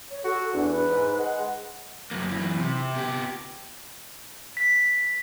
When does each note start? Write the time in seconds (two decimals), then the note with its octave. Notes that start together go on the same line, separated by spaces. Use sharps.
0.10 C#5
0.24 F#4 A4
0.53 E2 D4
0.71 B4
0.90 G#2
1.18 G#3 F#5
2.11 F#2 A#3
2.31 F#2 E3
2.59 C3
2.96 B3 G4
4.57 B6